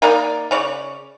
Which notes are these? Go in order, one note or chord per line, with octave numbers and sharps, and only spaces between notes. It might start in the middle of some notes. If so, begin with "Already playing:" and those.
A#3 D#4 A#4 D5
C#3 C#5 D5